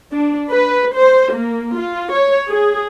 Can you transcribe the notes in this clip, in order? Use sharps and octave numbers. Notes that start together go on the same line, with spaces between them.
D4
B4
C5
A#3
F4
C#5
G#4